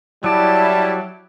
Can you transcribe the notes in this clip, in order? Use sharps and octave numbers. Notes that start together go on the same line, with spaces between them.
F#3 G3 E4 D5 A5